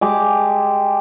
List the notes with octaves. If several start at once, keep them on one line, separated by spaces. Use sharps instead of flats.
G#3 G4 D6